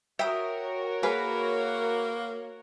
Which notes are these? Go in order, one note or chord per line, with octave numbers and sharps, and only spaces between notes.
F#4 A#4 C#5 E5 G5 D#6
A#3 G#4 B4